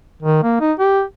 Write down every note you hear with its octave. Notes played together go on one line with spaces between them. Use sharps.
D#3
A#3
D#4
G4